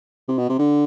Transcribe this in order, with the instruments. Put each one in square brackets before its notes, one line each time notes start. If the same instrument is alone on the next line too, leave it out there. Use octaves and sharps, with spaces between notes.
[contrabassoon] C3
B2
C3
D3